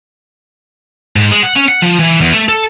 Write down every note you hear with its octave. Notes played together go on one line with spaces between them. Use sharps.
G#2
G#3
F#5
C#4
F#5
F3
E3
E2
A3
A4